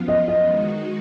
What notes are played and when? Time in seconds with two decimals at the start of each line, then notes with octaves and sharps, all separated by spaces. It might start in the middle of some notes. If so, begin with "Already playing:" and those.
Already playing: F#2 F3 B3 F4
0.08 D#5
0.28 D#5
0.47 D#3 G#3 D#4 F#4